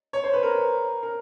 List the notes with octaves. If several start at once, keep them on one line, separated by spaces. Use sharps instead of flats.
C#5
C5
B4
A#4
A#4